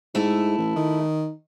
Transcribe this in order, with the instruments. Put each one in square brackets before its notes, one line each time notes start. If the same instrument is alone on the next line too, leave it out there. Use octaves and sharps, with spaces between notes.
[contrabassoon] G#2 [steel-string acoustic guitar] A3 E4
[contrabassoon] A1
D#3